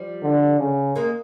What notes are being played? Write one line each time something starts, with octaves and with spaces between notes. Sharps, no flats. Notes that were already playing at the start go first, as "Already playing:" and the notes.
Already playing: F3 G3
D3
C#3
G#3 A#3